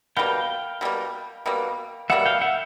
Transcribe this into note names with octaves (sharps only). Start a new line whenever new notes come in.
B2 G3 A#3 F5 G5
B2 G3 A#3
B2 G3 A#3
B2 G3 A#3 E5 F#5
F5 G5
E5 F#5